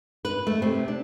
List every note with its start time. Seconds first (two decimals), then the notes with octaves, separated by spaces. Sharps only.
0.25 B4
0.47 A3
0.62 C3
0.88 D4